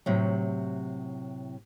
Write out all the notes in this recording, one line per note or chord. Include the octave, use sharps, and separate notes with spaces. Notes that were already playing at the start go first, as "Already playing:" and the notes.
A2 C3 F#3